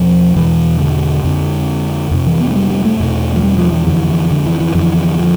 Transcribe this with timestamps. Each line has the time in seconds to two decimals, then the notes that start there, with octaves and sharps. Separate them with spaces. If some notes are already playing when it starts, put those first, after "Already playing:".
Already playing: E2 B2 F3
0.36 E2 B2 E3
0.80 D3
1.24 F2 D3
2.11 F2 C3
2.26 E3
2.40 B3
2.51 A3
2.56 G3
2.70 G3
2.85 A3
3.00 E2 B2
3.36 F3
3.43 G3
3.58 F3
3.72 E3
3.87 F2 D3 E3
4.09 E3
4.31 D3
4.46 E3
4.60 E3
4.75 F2 D3 E3
5.19 F3